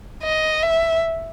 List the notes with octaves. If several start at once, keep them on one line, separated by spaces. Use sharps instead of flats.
D#5
E5